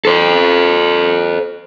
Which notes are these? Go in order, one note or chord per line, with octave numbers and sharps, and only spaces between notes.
A4 C5